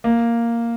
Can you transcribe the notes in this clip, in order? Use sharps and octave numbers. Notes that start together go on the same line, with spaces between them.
A#3